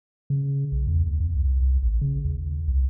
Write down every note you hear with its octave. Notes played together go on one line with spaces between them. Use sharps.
C#3
B1
E2
D2
E2
C2
C2
A1
C#3
D#2
C2